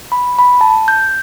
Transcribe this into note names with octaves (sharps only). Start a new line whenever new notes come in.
B5
B5
A5
G6